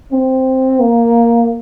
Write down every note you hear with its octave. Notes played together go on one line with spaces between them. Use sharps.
C4
A#3